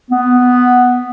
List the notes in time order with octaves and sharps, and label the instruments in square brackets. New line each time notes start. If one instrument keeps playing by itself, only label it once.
[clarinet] B3